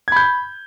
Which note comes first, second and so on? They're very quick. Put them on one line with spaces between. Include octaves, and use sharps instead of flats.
G#6 B5 G6